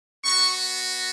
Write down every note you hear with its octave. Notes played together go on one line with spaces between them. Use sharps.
B3 F#4 C#6